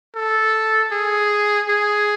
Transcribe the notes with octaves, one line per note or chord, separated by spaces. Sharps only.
A4
G#4
G#4